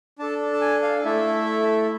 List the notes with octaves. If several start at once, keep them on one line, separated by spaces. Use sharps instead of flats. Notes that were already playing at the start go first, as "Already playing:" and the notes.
D4 A4 A5
A5
G#5
F5
A3 E4 A4 E5